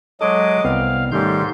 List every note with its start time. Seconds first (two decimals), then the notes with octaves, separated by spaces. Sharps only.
0.21 F#3 G#3 A4 C#5 D#5 D6
0.64 C2 B3 C4 F5
1.12 G#2 D#3 G3 A3 C#4 C6 G6